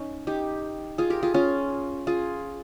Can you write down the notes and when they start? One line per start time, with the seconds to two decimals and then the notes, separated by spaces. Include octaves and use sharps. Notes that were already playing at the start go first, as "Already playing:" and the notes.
Already playing: A#3 C#4 D#4
0.27 D#4 G4
0.98 F4 G#4
1.10 G4 A#4
1.23 F4 G#4
1.34 C#4 F4
2.07 F4 G#4